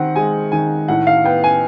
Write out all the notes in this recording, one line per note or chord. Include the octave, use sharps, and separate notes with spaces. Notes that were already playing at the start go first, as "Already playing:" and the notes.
Already playing: D#3 C4 F#5
G#3 G#5
D#3 G#5
A2 F#5
F5
B3 G5
G#5